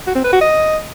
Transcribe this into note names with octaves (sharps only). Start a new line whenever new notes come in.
F#4
C4
B4
F#4
D#5